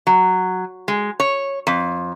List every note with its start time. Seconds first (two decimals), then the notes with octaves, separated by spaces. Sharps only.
0.07 F#3
0.88 G#3
1.20 C#5
1.67 F2